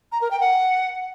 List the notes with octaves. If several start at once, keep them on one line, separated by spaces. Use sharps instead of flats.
A#5
A#4
G5
F#5